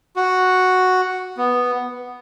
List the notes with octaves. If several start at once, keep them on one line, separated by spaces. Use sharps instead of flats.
F#4
B3